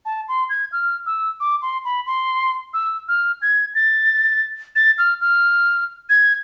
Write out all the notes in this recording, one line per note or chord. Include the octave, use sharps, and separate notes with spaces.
A5
C6
G#6
F6
E6
D6
C6
B5
C6
E6
F6
G#6
A6
A6
F6
F6
G#6